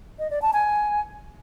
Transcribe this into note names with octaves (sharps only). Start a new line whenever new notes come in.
D#5
D5
A5
G#5